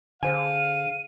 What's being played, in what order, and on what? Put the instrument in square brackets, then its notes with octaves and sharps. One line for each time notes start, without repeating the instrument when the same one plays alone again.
[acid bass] D3 [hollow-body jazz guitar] G#4 C5 G#5 [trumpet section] F5 [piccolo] D#7